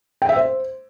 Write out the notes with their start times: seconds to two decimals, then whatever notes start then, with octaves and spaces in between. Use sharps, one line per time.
0.22 G5
0.29 E5
0.36 C5